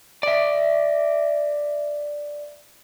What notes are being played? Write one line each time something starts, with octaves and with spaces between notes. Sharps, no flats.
D5 E5